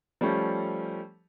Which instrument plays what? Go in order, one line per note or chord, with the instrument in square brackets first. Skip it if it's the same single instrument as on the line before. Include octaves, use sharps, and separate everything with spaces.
[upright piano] F3 G3 A3 C#4